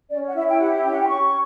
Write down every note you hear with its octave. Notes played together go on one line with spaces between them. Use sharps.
C#4 D5
F#5
E4 E5
G5
G4 F#5
C#4 G5
F#5
G5
C#4 C#6